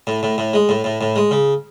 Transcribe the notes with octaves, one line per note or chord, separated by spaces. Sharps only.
A2
A2
A2
G#3
A2
A2
A2
G#3
C#3